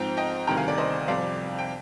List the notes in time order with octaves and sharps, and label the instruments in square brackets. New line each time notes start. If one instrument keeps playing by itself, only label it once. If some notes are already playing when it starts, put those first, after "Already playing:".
Already playing: [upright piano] G#2 F3 C4 D#4 G5 A#5
D#5 G5
D2 C3 D#3 G3 G5 A#5
F5 G#5
D5
C5 D#5
F2 C3 G3 D5 F5
G5